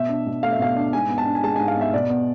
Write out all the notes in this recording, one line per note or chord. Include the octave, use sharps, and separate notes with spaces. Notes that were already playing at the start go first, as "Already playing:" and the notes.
Already playing: B2 E5
D4
B2
A3 F5
E5
B2 F5
D4
G#2 G#5
B3
A5
D4
G#5
G#3 A5
G#2 G#5
F5
B3 E5
B2 D5
B3